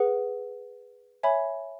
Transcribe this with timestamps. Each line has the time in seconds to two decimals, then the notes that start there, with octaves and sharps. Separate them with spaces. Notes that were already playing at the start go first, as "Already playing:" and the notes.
Already playing: G#4 B4 F#5
1.23 C#5 E5 G#5 B5